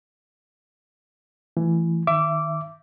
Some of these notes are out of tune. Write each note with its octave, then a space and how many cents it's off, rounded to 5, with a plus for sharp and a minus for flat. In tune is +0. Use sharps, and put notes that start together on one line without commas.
E3 +20 A3 +10
D#3 +0 E5 +25 D6 -10